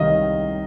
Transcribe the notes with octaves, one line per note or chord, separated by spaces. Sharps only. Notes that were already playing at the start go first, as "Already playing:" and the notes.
Already playing: C2 D#3 G3 D#5 F5